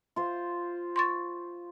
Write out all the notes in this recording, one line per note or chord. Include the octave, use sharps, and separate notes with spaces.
F4 C5
C6 C#6 A6